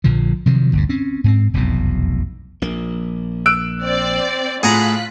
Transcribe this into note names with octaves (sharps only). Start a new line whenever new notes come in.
A#1 A#2 D3 F3
C3 D#3 F3 F#3
G1 D2 G2
C4 C#4
G#2 A#3 C4
F1 B1 E2 B2
A#1 A#3
E6 F#6 D7
C4 D5
A2 F4 G#4 F#5 A#5 F#6 B6